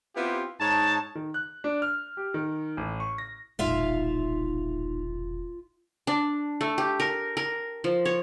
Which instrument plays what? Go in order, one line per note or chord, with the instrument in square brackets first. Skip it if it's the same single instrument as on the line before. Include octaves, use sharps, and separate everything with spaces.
[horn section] B3 C4 E4 F4 G4
G#2 D#4 C#5 A5
[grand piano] D#3
F#6
D4
F6
G4
D#3
A1
C#6
A#6
[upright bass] E1 A#1 [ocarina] D#4 [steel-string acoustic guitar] F4 E5 F5
[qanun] D4
A3
G4
A#4
A#4
F3
C#5